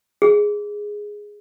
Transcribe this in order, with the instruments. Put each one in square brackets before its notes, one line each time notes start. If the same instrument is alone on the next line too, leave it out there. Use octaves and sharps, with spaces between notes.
[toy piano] G#4